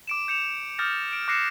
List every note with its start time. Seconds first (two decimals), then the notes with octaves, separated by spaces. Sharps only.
0.07 D6 D7 E7
0.28 G6 C#7 E7 F7
0.78 D6 D#6 F6 G6 A6 A#6
1.13 D7
1.28 D6 F#6 A#6 C7 C#7 E7